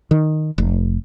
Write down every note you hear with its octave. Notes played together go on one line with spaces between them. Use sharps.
D#3
F1